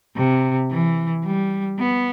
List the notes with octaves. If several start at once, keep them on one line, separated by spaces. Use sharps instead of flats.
C3
E3
G3
B3